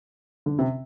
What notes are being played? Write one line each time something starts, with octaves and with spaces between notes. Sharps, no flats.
D3
C3